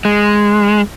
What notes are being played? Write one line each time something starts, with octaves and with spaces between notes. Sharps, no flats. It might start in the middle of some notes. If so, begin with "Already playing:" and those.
G#3